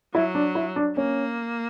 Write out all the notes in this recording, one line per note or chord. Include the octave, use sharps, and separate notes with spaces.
F#3 E4
D4
E4
D4
A#3 C#4